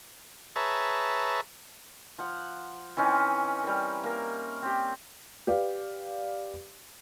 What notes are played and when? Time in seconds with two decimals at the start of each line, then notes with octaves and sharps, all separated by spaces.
0.56 G#4 B4 C#5 E5 A5 A#5
2.18 F3 F#5
2.97 E3 C4 C#4 D#4
3.63 G3 A#4
4.04 A#3 A#4
4.62 C4 G4
5.47 G4 B4 D5 F5